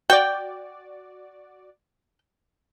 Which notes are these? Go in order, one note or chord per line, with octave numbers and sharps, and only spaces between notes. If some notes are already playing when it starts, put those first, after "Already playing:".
F#4 D5 G5